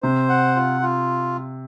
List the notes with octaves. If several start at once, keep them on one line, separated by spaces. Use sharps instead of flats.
C3 C5
F#5
F4
F4